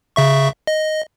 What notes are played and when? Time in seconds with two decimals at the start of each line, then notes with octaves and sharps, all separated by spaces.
0.16 C#3 E5 C#6
0.67 D#5